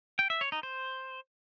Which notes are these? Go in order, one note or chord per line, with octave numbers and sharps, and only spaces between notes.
G5
E5
C#5
D#4
C5